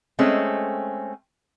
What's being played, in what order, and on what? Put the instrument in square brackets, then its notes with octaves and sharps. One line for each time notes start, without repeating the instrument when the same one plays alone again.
[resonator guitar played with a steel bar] G#3 A3 C4 C#4